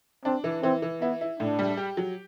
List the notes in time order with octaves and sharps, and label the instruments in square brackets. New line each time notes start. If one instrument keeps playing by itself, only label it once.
[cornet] C4 [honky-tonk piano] D4
[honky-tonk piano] E3
[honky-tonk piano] E3 [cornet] C4
[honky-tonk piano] E3
[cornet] B3 [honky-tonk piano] E4
[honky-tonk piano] E4
[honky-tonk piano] A2 [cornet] D4
[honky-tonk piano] G3
G4
F#3